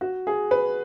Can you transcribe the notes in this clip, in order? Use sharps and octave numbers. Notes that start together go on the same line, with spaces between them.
F#4
G#4
B4